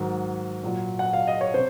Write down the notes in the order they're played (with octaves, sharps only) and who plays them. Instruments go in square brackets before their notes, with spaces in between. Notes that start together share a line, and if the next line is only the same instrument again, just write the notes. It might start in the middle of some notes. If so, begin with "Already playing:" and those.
Already playing: [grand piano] G#2 D#3 F#3
A#2 F#3
F#5
F5
D#5
C#5
C3 C5